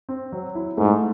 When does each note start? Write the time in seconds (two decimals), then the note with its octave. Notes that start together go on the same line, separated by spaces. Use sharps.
0.09 C4
0.32 F#3
0.55 E4
0.78 G#2 A3